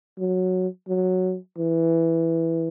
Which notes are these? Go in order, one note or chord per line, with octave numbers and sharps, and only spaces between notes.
F#3
F#3
E3